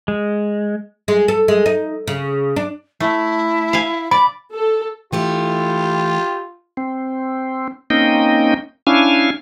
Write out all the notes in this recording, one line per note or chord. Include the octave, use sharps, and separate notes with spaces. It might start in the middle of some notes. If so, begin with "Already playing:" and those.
G#3
G#3
A4
G#3
D#4
C#3
D4
A3 E4
F5 G#5
D5 B5
A4
E3 A3 E4 F4 G4
C4
A#3 C4 C#4 D#4 D#5 G5
C#4 D4 E4 F5 G#5